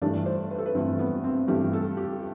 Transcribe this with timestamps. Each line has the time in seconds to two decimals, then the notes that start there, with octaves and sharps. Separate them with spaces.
0.02 G2 E3 A3 D4
0.26 C5
0.50 B4
0.58 A4
0.66 B4
0.75 G2 E3 A3 C4
0.99 B3
1.24 C4
1.48 G2 E3 A3 G4
1.73 A4
1.97 G4